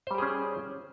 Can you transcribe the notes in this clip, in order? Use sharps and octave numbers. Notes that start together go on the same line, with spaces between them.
G3 C#4 G4 G#4 C5